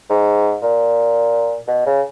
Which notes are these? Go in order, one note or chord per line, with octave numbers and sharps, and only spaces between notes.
G#2
A#2
B2
C#3